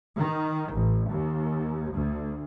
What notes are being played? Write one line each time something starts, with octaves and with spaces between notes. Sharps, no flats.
D#3
A1
D#2
D2